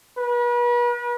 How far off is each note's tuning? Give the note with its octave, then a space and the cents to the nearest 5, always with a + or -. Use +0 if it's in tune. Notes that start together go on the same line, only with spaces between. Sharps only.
B4 -40